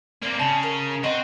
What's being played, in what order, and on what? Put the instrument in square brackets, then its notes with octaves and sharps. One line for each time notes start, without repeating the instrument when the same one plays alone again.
[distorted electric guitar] A#3 C4 [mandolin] D5
[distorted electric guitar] C#3 [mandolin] A5
[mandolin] A#4
[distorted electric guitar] C4 [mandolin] D#5 F#5 C#6